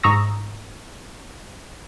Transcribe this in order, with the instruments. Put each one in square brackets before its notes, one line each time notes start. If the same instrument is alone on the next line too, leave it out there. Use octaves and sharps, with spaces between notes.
[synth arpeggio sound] G#2 A#5 C#6 D#6 E6 A#6